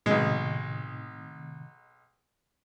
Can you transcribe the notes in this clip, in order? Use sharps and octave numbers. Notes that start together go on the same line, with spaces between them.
B1 A2 C3 D#3 G#3